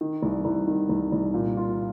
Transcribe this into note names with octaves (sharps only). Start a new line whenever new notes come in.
D#3
C2
C2
D#3
C2
C2
A#2
F4